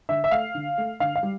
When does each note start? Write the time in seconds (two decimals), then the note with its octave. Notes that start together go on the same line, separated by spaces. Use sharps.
0.09 D3 E5
0.24 E5
0.31 A3 F5
0.55 D3
0.78 A3
1.00 D3 F5
1.16 F5
1.23 G3